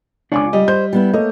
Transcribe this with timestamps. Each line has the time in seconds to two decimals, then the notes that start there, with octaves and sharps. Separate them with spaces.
0.32 C#2 D4 F4 C#5 G#5 D6
0.53 G3 D#5
0.68 C5 G6
0.93 G3 B3 E4
1.13 A3 A#3 C#5 D#5